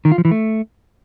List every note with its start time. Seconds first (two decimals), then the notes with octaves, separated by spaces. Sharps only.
0.05 D#3
0.12 F4
0.18 F3
0.25 E3
0.31 A3